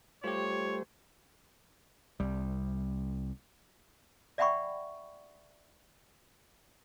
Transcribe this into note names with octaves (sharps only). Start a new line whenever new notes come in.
G3 A3 F4 G4 C5 C#5
C2 G3
D5 E5 F#5 G5 B5 C#6